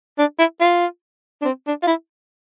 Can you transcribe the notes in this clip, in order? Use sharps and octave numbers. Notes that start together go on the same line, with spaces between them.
D4
E4
F4
D4
C4
D4
F4
E4